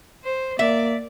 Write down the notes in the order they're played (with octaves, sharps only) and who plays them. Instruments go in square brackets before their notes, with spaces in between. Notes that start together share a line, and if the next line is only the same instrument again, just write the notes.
[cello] C5
[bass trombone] A#3 [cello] D5 [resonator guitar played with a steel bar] E5